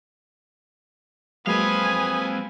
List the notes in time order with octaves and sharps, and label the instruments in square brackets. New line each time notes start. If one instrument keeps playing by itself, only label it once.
[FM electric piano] F#3 G#3 A#3 [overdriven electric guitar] C4 F5 [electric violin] B4 G#5 [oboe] D#6